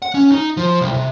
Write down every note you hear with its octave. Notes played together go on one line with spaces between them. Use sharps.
F#5
C#4
D#4
F3
C2
C3